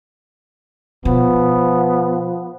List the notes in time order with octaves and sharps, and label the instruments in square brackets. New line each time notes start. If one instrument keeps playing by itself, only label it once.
[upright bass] B2 [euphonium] F3 [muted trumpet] B3